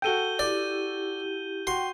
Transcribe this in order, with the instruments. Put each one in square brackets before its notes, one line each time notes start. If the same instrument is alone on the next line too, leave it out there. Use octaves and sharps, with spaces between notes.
[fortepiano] F#4 A4 G5 [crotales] G6 D#7 G7
[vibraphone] E4 G4 [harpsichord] D5
[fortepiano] F#4 [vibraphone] G5 [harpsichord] C6